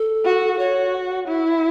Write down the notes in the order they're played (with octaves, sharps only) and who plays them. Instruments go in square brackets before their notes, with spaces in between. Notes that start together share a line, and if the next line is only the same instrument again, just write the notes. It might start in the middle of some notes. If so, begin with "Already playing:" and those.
Already playing: [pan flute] A4
[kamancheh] F#4
[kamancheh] F#4 [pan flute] C#5
[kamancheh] E4